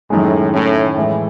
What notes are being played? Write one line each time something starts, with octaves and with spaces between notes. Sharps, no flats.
F#2 A2 D#3 G#3
A2 D#3 A3 C#4
A2 E3 G#3